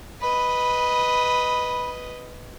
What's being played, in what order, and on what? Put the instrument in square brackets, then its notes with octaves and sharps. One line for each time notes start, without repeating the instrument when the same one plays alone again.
[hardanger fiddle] B4 D#5 [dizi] B5